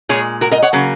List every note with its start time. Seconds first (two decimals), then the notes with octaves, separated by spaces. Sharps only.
0.09 A#2 G#3 G#4 C#5
0.41 F#4 A#4
0.51 A#4 D#5
0.62 C#5 F#5
0.73 C#3 F#3 A#3